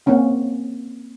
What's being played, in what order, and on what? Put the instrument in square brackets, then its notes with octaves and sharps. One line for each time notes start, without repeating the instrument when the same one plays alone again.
[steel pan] A#3 C4 C#4 F#5